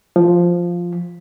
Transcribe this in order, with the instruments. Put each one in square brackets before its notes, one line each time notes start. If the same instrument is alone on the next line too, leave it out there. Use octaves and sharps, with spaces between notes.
[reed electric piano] F3